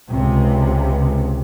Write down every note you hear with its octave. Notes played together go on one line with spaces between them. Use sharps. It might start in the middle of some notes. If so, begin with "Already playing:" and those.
C#2 C3